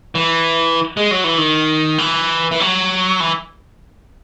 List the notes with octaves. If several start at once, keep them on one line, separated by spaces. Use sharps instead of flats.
E3
G#3
F#3
E3
D#3
E3
E3
F#3
E3